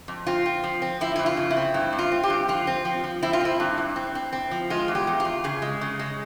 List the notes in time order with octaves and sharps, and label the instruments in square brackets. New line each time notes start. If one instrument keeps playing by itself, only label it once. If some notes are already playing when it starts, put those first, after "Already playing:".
[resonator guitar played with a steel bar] F2
C4 F4
C4
F3
C4
F3 E4
F2 E4
F4
C#3
E4
C4
G2 E4
G2
F4
C4
G4
G2
F3 F4
C4
F3
F3
C4 E4
F4
C4 E4
G2
G2
C4
C4
C4
F3
G#3 F4
E2
G4
E2
F4
E2
C#3 G#4
G#3
C#3
G#3